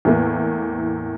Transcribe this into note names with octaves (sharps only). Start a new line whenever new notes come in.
E2 A2 E3 A#3